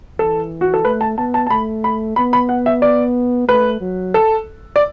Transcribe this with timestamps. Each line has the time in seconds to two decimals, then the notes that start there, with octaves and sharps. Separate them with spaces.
0.19 E3 A4
0.61 F#4
0.74 A4
0.85 A3 B4
1.01 A5
1.18 B3 A5
1.34 A5
1.47 A5
1.50 A3 B5
1.84 B5
2.16 B3 B5
2.33 B5
2.49 F#5
2.66 E5
2.82 D5
3.48 A3 B4
3.81 F#3
4.14 A4
4.76 D5